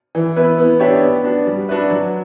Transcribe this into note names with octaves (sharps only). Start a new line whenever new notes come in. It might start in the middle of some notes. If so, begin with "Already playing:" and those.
E3
B3 E4 B4
B3
D4 G4 C#5 E5
B3
D4 F#4
G3
D4 F#4 B4 E5
F#3